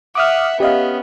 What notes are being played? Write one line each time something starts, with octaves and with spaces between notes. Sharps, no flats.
E5 F#5 D6 D#6 F6
B3 C#4 G4 D#5 F5